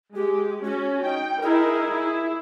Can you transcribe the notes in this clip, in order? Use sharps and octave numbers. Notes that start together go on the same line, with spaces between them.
G#3 G4
C#4 F#4
D#4 G5
D#4 E4 G#4 A#4
E4